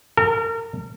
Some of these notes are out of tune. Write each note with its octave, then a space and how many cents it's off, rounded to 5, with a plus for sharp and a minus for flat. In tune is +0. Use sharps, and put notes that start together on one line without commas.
A#4 -35